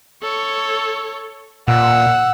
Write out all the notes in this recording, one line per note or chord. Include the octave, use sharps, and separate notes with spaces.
A4 C#5
A#2 F#5 E6